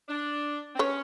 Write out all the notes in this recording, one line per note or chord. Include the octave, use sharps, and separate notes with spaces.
D4
C4
C#4 B4 C#5